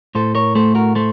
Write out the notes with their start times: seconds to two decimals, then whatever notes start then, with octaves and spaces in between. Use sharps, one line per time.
0.15 A2 A4 C5
0.35 A#4 C#5
0.55 A3 A4 C5
0.75 F#4 A#4
0.95 A3 A4 C5